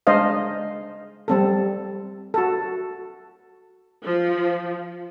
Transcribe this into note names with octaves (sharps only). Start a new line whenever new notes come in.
G#3 D4 C5 D#5 F5
G3 C4 A4
F#4 A4
F3